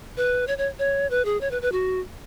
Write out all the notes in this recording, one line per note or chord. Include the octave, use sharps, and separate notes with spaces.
B4
C#5
C#5
C#5
B4
G#4
C#5
B4
B4
F#4